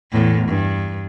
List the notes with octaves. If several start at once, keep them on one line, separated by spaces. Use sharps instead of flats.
E2 A2
G2